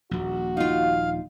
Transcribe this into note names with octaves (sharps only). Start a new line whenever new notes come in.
D#1 A#1 F#4
D#4 F4 F5